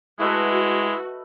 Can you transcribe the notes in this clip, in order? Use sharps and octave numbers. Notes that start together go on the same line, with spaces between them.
G#3 A3 E4 F#4 B4 D#5